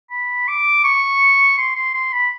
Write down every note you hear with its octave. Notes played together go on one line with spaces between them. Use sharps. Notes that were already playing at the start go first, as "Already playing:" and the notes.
B5
D6
C#6
C6
C6
C6
B5